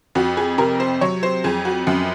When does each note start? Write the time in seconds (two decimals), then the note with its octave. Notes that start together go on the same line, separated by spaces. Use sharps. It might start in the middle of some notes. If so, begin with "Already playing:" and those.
0.15 F2 F#4
0.37 G#4
0.58 C3 A#4
0.80 C5
1.01 F#3 C#5
1.23 C5
1.44 F2 G#4
1.65 F#4
1.87 F#2 F#4